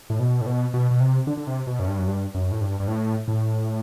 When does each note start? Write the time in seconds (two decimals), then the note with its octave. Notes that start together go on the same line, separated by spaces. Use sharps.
0.10 A2
0.20 B2
0.41 A2
0.47 B2
0.74 B2
0.91 B2
1.00 C3
1.27 D3
1.37 D3
1.47 C3
1.67 B2
1.80 F#2
1.88 G2
1.98 F#2
2.07 G2
2.35 F#2
2.52 A2
2.61 G2
2.80 G2
2.88 A2
3.28 A2